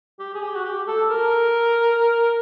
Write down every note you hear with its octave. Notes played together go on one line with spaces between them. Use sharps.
G4
G#4
G4
F#4
G4
A4
A#4